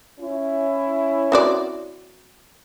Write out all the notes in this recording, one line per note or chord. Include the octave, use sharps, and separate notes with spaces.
C#4 E4
C4 F#4 D5